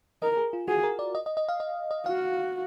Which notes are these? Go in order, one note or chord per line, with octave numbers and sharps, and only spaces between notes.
A#4 D#5
G#4
F4
F#4 G#4
A#4
D5
D#5
D#5
D#5
F5
D#5
D#5
F#4 F5